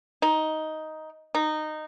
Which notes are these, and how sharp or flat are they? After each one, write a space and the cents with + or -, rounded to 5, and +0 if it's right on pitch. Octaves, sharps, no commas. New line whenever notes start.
D#4 +10
D#4 -15